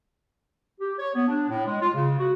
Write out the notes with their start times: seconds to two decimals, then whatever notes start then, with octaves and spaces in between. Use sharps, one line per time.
0.81 G4
0.99 C#5
1.15 B3
1.28 D4
1.49 A2
1.66 G#3
1.80 F4
1.94 C#3
2.19 F#4